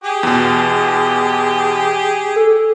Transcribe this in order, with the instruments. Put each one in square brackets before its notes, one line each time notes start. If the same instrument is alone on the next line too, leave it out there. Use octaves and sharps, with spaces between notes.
[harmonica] G4 G#4
[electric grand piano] E2 B2
[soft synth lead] A4